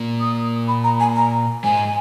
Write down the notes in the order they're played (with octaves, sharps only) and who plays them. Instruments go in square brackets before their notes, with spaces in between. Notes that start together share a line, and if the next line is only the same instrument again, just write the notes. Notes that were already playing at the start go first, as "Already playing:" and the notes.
Already playing: [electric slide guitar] A#2 A#3
[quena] D#6
B5
A#5
G#5
A#5
[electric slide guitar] G#2 G#3 [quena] G#5